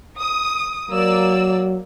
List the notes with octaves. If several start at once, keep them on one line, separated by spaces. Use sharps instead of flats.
D#6
F#3 A#3 D5 E6